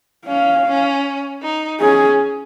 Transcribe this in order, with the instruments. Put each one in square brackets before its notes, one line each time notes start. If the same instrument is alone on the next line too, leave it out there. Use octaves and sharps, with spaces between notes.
[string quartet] C#4 [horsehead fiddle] F5
[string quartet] C#4
D#4
[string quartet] C#4 [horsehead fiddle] G#4